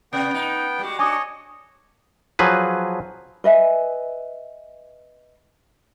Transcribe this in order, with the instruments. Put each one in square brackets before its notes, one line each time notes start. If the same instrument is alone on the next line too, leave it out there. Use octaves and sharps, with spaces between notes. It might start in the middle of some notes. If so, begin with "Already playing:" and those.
[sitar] C3 [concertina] B3 G5
[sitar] D#4
G3 G#3 F#4
[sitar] D4 F#4 [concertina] C#5 D#5 [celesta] G#5 D6 D#6
[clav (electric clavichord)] F3 F#3 G#4 B4
[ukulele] B4 D#5 E5 G#5